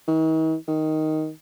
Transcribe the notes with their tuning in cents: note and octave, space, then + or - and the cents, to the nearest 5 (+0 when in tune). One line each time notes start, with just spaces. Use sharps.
D#3 +45
D#3 +5